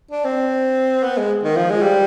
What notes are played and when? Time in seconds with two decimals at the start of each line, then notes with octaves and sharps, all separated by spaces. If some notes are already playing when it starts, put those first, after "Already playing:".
0.11 D4
0.25 C4
1.03 B3
1.17 G#3
1.44 D#3
1.56 F3
1.70 G#3
1.82 G3